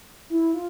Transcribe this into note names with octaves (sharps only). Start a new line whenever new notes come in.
E4
F4